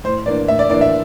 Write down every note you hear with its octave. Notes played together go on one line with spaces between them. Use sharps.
A2 C5
E3 A#3 D4 D5
A2 E5
D5
E3 A#3 D4 D5
E5